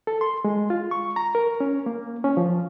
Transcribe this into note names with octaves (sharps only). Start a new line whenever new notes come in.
A4
C6
G#3
F4
C#6
A#5
A#4
C#4
A#3
C#4
F3